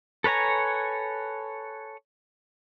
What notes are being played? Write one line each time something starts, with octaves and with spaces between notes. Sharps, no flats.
A4 B4 C#5 G#5 A#5